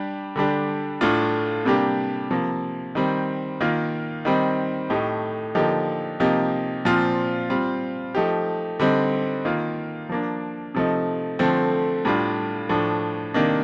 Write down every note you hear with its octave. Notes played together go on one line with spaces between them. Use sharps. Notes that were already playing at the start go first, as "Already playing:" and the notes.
Already playing: G3 D4 G4
D3 G3 D4 G4
A2 A3 D4 F4
C3 G3 A#3 D4 G4
C3 F3 A#3
D#3 G3 C4
D#3 A#3 F4
D#3 G3 C4 D#4
A2 A3 D#4 G4
D3 F3 A#3 D#4 G4
C3 F3 A#3 D#4 G4
A#2 F3 C4 F4
G3 C4 F4
F3 A3 D#4 G4
D3 G3 C4 D#4
D#3 A#3 F4
F3 A#3 D4
C3 F3 A3 D#4
D3 F3 A3 C4
A2 G3 D4 F4
A2 F3 A3 D4
C3 D#3 A#3 D4